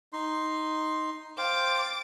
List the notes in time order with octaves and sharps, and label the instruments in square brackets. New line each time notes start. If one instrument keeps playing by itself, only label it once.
[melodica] D#4 C6
[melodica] C5 F5 G5 [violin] D6 A6